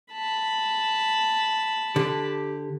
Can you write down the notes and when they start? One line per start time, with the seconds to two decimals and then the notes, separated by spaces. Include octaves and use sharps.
0.13 A5 B5
1.96 D3 G4